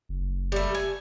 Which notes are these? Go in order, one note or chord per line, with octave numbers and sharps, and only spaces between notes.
F#1
G3 A3
G#5